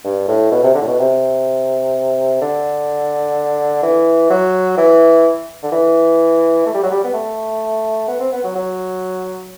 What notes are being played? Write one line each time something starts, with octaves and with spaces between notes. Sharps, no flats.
G2
A2
B2
C3
D3
A2
B2
C3
D3
E3
F#3
E3
D3
E3
A3
G3
F#3
G3
B3
A3
B3
C4
B3
F#3
F#3